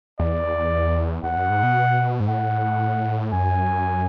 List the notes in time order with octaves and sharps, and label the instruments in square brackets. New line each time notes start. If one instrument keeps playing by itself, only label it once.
[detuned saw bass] E2 [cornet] D5
[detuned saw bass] E2 [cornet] F#5
[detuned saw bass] F#2
G#2
B2
G#2
[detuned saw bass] A2 [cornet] F#5
[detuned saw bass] F#2 [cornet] G#5